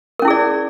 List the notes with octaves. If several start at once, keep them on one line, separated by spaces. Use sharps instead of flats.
C#4 E4 G#4 A#4 D5